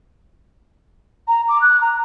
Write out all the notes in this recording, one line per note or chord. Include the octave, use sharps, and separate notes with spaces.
A#5
D6
F#6
A#5